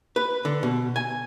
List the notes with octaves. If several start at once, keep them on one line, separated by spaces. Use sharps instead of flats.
B4
D3
B2
G#5